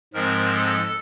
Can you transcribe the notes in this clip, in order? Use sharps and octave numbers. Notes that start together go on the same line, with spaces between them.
G#2 F3 G#3 C4 A#4
A4